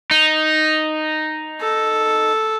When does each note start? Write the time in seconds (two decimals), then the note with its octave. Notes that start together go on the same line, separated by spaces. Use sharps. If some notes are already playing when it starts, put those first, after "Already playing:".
0.11 D#4
1.61 A4